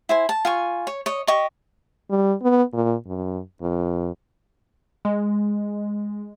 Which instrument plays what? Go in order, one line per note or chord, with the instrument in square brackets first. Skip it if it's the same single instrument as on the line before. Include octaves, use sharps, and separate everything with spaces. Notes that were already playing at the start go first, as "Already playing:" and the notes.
[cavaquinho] E4 C5 G#5
A5
F4 G#5 C#6
C#5
C#5 D#5
G4 D#5 C#6
[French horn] G3
B3
A#2
F#2
F2
[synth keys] G#3